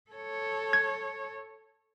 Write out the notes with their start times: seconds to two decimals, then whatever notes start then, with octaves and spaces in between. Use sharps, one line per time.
0.11 A4 C#5
0.73 G#6